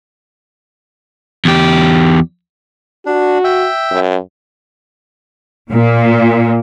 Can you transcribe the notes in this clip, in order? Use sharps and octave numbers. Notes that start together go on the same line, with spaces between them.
E2 G4
D4 F#4
E5 G5
F#2
A#2